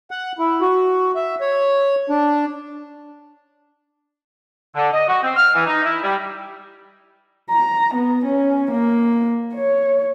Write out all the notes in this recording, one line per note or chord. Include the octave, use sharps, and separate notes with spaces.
F#5
E4
F#4
E5
C#5
D4
D3
D#5
F#4
C4
F6
E3
D#4
E4
G3
A#5
B3
C#4
A#3
C#5